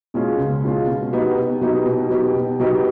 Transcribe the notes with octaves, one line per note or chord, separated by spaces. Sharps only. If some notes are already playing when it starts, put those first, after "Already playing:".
B2 G#3 C#4 F4
C#2
B2 G#3 C#4 F4
B2
F#3 B3 D#4 G4
B2
F#3 B3 D#4 G4
B2
F#3 B3 D#4 G4
B2
F#3 B3 D#4 G4